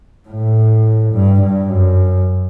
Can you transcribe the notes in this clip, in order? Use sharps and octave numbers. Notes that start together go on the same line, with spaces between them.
A2
G2
G2
F#2